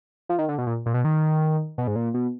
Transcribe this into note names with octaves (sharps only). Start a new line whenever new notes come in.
F3
D#3
D3
B2
A#2
A#2
B2
D#3
B2
G#2
A#2
B2